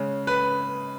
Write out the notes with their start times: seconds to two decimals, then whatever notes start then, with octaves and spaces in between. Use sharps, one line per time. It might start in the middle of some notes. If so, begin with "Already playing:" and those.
Already playing: C#3 G#3 C#4
0.27 B4